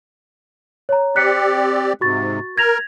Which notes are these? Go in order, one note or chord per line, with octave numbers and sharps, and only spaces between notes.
C#5 A#5
C4 G4 D5 F#6 B6 C#7
G#2 C3 F#4 C#6 A6
A#4 G#6 A#6 F7